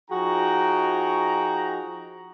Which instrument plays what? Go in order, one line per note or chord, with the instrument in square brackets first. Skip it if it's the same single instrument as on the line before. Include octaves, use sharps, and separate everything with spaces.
[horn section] F3 D#4 F#4 G#4 G5 A#5